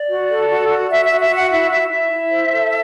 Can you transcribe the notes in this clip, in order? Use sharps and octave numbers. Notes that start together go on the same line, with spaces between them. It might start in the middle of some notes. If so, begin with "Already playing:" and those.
Already playing: D5
F#4
A4
F#4
F#4
F#4 E5
E5
F#4
E5
F#4
F#5
E4 E5
E4 E5
E4 E5
E4
C5
A4